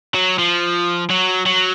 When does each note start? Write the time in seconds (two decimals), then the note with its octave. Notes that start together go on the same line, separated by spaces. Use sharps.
0.14 F#3
0.38 F3
1.10 F#3
1.46 F#3